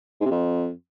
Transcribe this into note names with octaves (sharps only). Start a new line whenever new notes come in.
G#2
C3
F2